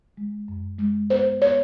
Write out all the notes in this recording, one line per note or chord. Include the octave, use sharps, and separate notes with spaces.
G#3
F#2
G#3
B3 C5
B3 C#5